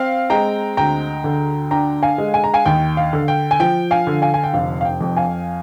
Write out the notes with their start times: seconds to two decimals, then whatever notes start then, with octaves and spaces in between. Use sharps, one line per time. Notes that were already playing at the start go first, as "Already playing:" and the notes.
Already playing: C4 F5
0.30 G#3 G5 A#5
0.77 D2 G5 A#5
1.24 D3
1.71 D4 G5 A#5
2.03 F5 G#5
2.18 G#3
2.34 G#5
2.44 A#5
2.54 F5 G#5
2.65 D#2 G5
2.97 F5
3.13 D3
3.28 G5
3.51 G#5
3.60 F3 G5
3.91 F5 G#5
4.07 D3
4.22 F5 G#5
4.34 G#5
4.44 G5
4.53 F1 F5
4.81 F5
4.85 G5
5.01 F2
5.17 F5 G#5